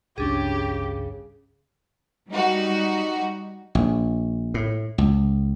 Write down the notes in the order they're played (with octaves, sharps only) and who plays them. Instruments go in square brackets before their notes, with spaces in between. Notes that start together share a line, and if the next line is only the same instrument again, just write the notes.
[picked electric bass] G#1 C#2 G2 [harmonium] C#3 [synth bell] C#4 D4 G#4 [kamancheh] G4
[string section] G3 D#4 F#4
[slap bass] A#1
A2
C#2